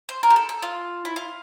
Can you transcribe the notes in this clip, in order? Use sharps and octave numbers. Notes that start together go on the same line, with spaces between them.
C5
A#4
G4
A4
A4
F4
E4
F4